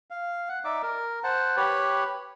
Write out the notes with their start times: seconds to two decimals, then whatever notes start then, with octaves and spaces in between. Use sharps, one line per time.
0.10 F5
0.49 F#5
0.65 D#4 D5 E5 D6
0.83 A#4
1.24 C5 F#5 A5
1.56 G4 B4 C#5